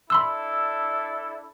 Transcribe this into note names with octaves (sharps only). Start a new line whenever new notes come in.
D4 E4 A4 B5 C6 E6